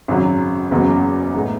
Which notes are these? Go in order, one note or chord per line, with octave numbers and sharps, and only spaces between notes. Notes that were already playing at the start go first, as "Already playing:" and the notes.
G#1 F#2 C#3 F#3
F#1 E2 C#3 F#3
A2 G#3 B3 D#4